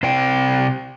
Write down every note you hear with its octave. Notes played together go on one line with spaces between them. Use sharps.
C3 C5 D5 G5